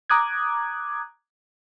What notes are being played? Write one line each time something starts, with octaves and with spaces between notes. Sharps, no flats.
A#5 D6 D#6 F#6 G#6